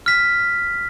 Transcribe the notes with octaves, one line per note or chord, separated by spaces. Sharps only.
F6 B6